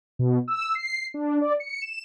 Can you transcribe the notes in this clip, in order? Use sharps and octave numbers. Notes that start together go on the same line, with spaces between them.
B2
E6
C7
D4
D5
C#7
E7